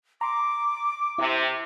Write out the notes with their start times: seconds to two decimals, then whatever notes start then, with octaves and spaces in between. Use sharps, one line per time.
0.21 A#5 C6 D6
1.18 C3 E4